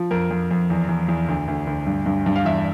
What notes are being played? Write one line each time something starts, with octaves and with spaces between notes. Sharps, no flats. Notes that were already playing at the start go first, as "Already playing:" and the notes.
Already playing: F3
F2 A#4
F2
F2
E2
E2
E2
D2
D2
D2
G2
G2
G2
F5
E2 E5